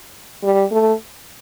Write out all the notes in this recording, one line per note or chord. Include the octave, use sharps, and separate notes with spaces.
G3
A3